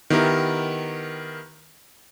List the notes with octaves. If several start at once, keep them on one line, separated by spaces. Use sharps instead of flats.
D#3 B3 E4 G4 A#4